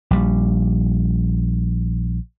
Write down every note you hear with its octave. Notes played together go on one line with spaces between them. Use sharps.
A#1 G3